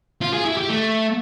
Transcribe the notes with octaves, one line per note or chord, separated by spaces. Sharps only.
F4
G#4
E4
G4
A3